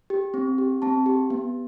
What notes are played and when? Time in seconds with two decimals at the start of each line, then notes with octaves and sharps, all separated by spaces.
0.10 G4
0.34 C4
0.58 G4
0.82 C4 A5
1.06 G4
1.30 B3